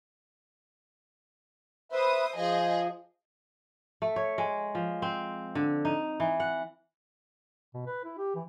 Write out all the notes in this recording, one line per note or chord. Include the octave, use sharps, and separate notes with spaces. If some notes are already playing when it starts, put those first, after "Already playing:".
B4 C5 E5 D#6
F3 G#4 D#5
A3
C#5
G#3
F3
C4
D3
D#4
E3
F#5
B2
B4
E4
G4
E3